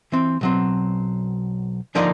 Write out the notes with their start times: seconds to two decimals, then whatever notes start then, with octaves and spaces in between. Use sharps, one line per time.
0.12 E3 C4
0.41 B1 F#3 C4
1.95 D3 F3 A#3 D#4 D5